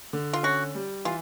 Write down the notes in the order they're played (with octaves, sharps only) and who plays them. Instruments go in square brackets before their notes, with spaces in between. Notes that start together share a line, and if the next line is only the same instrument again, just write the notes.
[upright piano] D3
[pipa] F4
[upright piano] C#4 [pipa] F#4
[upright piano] G3
[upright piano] E3 [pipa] F4